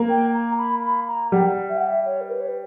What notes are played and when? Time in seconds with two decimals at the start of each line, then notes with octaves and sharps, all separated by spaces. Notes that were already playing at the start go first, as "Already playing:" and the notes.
Already playing: A#3
0.09 G5
0.34 A#5
0.58 B5
0.83 B5
1.08 A#5
1.32 G3 F#5
1.39 G5
1.46 F#5
1.69 E5
1.77 F#5
1.86 E5
2.06 C#5
2.21 A#4
2.31 B4
2.41 C#5
2.48 B4